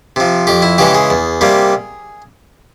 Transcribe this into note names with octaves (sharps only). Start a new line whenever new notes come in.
C3 F3
F2 G4
E4
C#3 E3 G#3 G4
G#4
E2
C3 G3 A#3